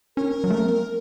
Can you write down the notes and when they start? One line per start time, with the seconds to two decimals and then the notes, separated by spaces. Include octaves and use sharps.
0.17 C#4 A#4
0.44 F#3
0.50 A3
0.58 A#3
0.64 C4